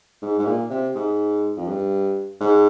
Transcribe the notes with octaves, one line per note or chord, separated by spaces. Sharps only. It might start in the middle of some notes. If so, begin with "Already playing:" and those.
G#2
G#2
A#2
C3
G#2
F2
G2
G#2